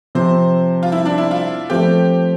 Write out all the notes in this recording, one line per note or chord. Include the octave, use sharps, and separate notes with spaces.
C3 F3 C4 C5
F4
E4
D4
E4
F4
F3 A3 C4 G4